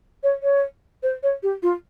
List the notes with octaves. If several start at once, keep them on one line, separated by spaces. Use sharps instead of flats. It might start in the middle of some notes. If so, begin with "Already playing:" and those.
C#5
C#5
C5
C#5
G4
F4